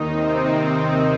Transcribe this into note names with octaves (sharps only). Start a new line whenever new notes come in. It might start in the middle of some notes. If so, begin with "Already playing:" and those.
Already playing: D#2 D#3 D#4
C3 C4